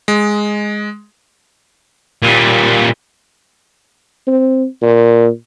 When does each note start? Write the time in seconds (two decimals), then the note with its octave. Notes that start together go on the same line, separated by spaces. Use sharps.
0.08 G#3
2.22 A#2 G3
4.27 C4
4.82 A#2